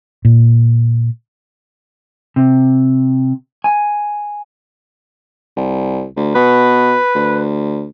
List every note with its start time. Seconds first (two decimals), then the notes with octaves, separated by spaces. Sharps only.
0.25 A#2
2.36 C3
3.64 G#5
5.57 C2
6.17 D2
6.35 B2 B4
7.15 D2